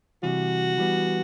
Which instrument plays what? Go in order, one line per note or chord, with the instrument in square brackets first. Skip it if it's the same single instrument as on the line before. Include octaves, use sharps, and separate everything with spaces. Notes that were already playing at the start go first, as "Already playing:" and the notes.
[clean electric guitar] C3 E3 G3 [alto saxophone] F#4
[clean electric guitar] E3 G3 B3